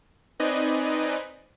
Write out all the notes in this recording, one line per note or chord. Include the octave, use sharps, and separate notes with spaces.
C4 D#4 B4 D5 D#5 G#5